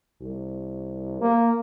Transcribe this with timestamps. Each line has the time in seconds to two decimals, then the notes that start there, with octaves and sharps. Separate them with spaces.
0.21 C2
1.21 A#3